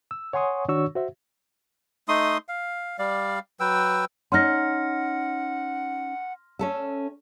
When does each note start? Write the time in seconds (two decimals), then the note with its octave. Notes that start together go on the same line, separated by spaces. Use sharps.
0.11 E6
0.33 C#5 F#5 G#5 C6 C#6 D#6
0.68 D#3 D4 F#4 C#5 C#6 E6
0.95 F#4 C5 E5
2.08 A3 D#4 C6 D#6
2.48 F5
2.99 G3 D5 F5
3.60 F#3 B4 G5 E6
4.32 C#4 D#4 F#5 C6 F6 A#6
6.59 C#4 A4 E5